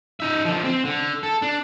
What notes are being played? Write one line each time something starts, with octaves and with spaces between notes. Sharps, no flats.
D#4 E5
D3 F3
C4
D3
A4
D4